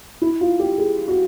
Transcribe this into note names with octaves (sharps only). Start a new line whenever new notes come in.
E4
F4
G4
G#4
F#4